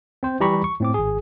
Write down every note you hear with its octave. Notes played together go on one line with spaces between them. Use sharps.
C4 C5
E3 G3 G4 A#5 B5 C#6
C#6
A2 C4 D6
G#1 G#4